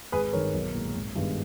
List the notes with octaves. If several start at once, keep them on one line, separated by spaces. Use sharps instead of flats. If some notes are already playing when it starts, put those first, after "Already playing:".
G#1 G#4 B4
G2 D#3 A#4 C#5
B1
A#2 G#3
G#1
G2 D#3 G#3 B3